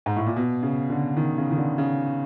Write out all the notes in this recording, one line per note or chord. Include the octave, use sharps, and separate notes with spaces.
G#2
A2
A#2
B2
C#3
D3
D#3
C#3
D#3
D3
C#3